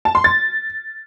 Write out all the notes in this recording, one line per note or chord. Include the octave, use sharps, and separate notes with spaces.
A5
C6
A6